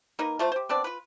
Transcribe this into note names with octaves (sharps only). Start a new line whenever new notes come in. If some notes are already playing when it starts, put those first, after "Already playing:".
A#3 D#4 A#4 B4
A3 F4 C5 F5
G4 C5
B3 C4 D4 D5
F4 B4